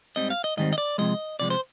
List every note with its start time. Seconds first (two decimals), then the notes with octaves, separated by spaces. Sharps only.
0.16 G#2 D#3 G3 C4 D#5
0.30 F5
0.44 D#5
0.57 G#2 D#3 G3 C4 D#5
0.73 D#5
0.78 D5
0.98 C3 F3 G#3 D#5
1.39 C3 F3 G#3 D5
1.50 C5